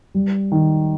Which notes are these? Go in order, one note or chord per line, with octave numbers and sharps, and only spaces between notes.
G3
D#3